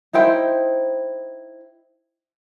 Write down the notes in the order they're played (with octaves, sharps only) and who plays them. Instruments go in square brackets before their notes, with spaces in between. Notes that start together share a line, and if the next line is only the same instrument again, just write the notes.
[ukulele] D#4 E4 C5 G5